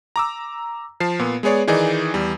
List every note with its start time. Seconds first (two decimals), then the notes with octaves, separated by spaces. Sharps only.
0.16 A#5 D6 E6
1.00 F3 A5 C7
1.19 A#2 B3
1.43 G#3 B3 G#4 C#5 D5
1.67 D#3 E3 D#4 G#4 D5
2.14 E2 G3